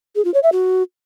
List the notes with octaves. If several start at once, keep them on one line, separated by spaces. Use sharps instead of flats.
G#4
F4
C#5
E5
F#4